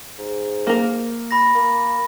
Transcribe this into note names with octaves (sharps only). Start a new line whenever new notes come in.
G#2
A#3 A#4
B5 A#6
A#3